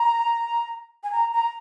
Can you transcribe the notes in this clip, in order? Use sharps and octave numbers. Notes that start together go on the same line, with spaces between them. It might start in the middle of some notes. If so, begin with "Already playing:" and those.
Already playing: A#5
G#5
A#5
A#5